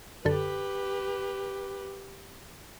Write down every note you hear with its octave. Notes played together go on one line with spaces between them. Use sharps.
F#2 D3 G4 A4 B4